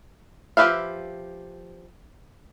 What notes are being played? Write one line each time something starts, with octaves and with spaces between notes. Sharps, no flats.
F3 G4 B4 E5 F5